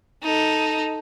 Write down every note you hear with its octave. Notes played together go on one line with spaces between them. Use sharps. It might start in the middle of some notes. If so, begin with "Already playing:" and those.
D#4 A4